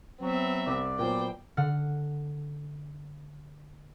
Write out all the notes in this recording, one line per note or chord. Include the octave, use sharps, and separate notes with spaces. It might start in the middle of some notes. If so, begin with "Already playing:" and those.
F#3 B3 C4 E5
C2 D5
A#2 F#3 B3 C5 G5
D3 F#5 F6